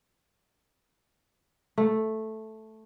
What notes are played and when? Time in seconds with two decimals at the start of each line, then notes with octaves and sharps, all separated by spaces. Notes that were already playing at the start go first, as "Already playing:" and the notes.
1.78 A3